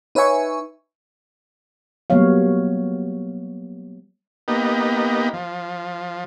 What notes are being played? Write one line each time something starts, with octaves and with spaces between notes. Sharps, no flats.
D#4 B4 C#5 E5 G#5 C#6
F#3 G3 A#3 B3 C#5 F5
A#3 B3 D#4 G4
F3